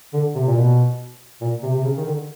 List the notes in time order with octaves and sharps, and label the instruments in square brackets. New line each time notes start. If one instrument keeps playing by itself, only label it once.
[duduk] D3
C3
A#2
B2
A#2
C3
C3
C#3
D#3
D3